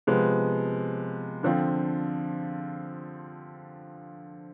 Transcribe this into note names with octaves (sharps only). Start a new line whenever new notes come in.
C3 F3 G#3 B3
D3 F3 C4 F4